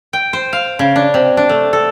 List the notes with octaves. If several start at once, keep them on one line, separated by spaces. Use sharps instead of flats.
G5
C5
F5
C#3
D4
C3
D4
A3
A4